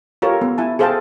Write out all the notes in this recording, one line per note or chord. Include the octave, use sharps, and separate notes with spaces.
F4 G4 A4 A#4 C#5
B3
E4 G#5 A5
G#4 A4 C5 F5 G5 A5